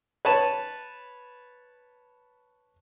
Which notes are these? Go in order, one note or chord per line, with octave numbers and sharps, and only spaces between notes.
B4 C#5 A5